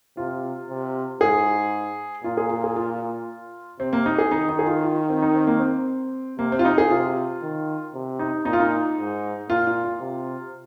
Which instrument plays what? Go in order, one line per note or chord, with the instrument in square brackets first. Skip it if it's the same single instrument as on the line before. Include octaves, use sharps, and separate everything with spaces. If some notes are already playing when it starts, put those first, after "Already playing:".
[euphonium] C3 [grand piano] F4
[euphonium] C3
[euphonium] G#2 [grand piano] G#4
[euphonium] A#2 [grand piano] F4
[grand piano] G#4
F4
G#4
F4
[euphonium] C3 [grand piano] C4
[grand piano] A#3
D#4
G#4
[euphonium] D#3 [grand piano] D#4
[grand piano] D#4
G#4
F4
F4
C4
D#4
C4
A#3
C4
[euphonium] C3 [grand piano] A#3
[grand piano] C4
F4
D#4
G#4
[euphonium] C3 [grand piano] F4
[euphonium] D#3
C3
[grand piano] D#4
[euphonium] A#2 [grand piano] D#4
[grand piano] F4
D#4
[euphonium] G#2
[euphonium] A#2 [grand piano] F4
[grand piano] F4
F4
[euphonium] C3